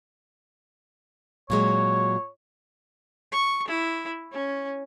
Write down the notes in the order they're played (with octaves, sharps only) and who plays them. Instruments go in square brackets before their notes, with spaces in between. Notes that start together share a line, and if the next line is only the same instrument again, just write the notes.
[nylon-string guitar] A#2 F#3 G#3 [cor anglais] C#5
[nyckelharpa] C#6
E4
C#4